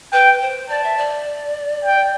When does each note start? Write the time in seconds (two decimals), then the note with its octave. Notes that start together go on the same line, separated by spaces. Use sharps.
0.12 B4 G5
0.42 C5
0.69 D5 A5
0.84 E5
0.98 D5
1.85 G5